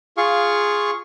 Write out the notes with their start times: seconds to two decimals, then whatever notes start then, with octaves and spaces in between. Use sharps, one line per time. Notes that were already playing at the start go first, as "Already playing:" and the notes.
0.17 F4 G#4 F5 C#6